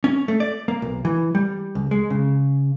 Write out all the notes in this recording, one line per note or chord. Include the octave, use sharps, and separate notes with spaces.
C#4
A3
D5
A#3
B1
E3
G3
C#2
G#3
C#3